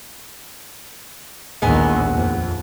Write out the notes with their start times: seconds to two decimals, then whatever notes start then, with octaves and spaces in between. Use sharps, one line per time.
1.62 A#1 D#2 G#3 B3 G#5
2.14 F2